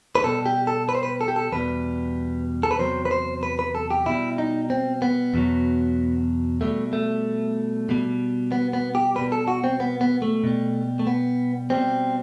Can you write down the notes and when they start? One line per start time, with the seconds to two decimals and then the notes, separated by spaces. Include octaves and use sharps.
0.15 B4
0.24 B2 G3 A4
0.46 G4
0.67 A4
0.89 B4
0.95 C5
1.03 B4
1.21 A4
1.28 G4
1.36 A4
1.52 E2 B2 G3 B4
2.63 A4
2.71 B4
2.79 E2 C3 F#3 C5
3.05 B4
3.11 C5
3.43 B4
3.59 B4
3.75 A4
3.91 G4
4.06 B2 G3 E4
4.38 D#4
4.70 C4
5.02 B3
5.34 E2 B2 F#3
6.61 B2 G3 A3
6.93 A3
7.89 B2 G3
8.52 B3
8.73 B3
8.95 G4
9.15 B2 G3 B4
9.32 A4
9.48 F#4
9.64 C4
9.80 B3
10.01 B3
10.22 A3
10.44 B2 G3
10.99 A3
11.07 B3
11.70 B2 G3 C4